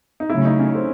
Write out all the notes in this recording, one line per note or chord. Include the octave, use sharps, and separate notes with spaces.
D#4
C#3 F#3 A3 E4
D#4
C#4
C4